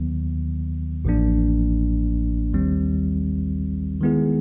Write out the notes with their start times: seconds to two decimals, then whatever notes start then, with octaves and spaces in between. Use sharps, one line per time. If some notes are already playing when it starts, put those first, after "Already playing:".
Already playing: D#2 D#3 F#3 B3
1.05 A1 A2 F3 A#3 D4
2.53 D#2 D#3 G3 C4
4.01 D#3 G#3 B3 E4 G#4